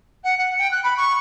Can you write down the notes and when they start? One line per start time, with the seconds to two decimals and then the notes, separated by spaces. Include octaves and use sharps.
0.24 F#5
0.37 F#5
0.59 G5
0.71 F#6
0.83 B5
0.97 C#6